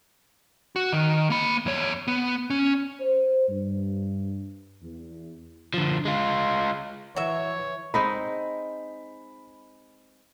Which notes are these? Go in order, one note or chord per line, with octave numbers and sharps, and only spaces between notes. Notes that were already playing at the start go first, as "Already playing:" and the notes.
F#4
D#3
A#3 B5
E2 C#5
B3
C#4
C5
G2
E2
D3 F3
G#3 F4
E3 F#3 C#5 E5
G#3 C4 D#4 B5